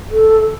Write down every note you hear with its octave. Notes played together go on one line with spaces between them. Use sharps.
A4